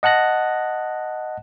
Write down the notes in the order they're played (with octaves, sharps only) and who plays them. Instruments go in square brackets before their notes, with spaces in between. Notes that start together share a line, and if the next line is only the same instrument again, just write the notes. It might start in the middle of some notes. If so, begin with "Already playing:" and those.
[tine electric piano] D#5 F#5 A5 F#6 A#6